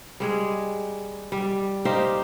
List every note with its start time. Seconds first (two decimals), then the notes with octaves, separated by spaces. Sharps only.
0.20 G3 G#3 G#4
1.32 G3
1.85 D#4 G4 C5 F5